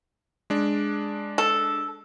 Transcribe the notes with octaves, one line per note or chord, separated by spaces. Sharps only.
G#3 D4
A4